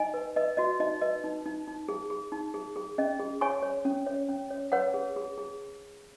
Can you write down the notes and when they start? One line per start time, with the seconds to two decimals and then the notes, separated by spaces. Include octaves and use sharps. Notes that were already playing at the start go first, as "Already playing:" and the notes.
Already playing: D#4 D#5 G#5
0.14 B4
0.36 B4 D#5
0.57 F#4 D#5
0.80 D#4 D#5
1.01 B4 D#5
1.24 D#4
1.46 D#4
1.67 D#4
1.89 G#4
2.10 G#4
2.32 D#4
2.54 G#4
2.76 G#4
2.98 C#4 D#5
3.19 G#4
3.41 C#5 G#5 C#6
3.63 C#5
3.85 C#4
4.06 C#5
4.29 C#4
4.51 C#5
4.72 B4 C#5 F#5
4.94 G#4
5.16 G#4
5.38 G#4